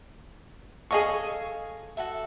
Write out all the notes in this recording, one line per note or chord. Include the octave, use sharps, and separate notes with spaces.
G#4 A4 D#5 F5 G#5 C#6
F#4 A4 E5